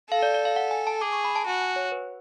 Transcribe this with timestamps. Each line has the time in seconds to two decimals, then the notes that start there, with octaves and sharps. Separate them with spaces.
0.11 A4 F5
0.23 D5
0.34 D5
0.45 F5
0.56 F#5
0.71 G#5
0.87 A5
1.01 G#4 D6
1.13 C#6
1.24 B5
1.36 A5
1.46 F#4 G#5
1.61 G#5
1.76 C#5
1.92 B4